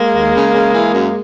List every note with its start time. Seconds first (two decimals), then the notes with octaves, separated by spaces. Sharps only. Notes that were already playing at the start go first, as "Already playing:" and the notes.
Already playing: G#3 A#3
0.14 D#2
0.33 C#3
0.52 C#3
0.73 E3
0.93 F#2